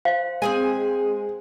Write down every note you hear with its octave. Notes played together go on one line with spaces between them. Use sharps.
C5 F5
G#3 C4 G#4 G#5